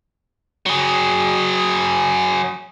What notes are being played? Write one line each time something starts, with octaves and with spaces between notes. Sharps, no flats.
F#3 G#4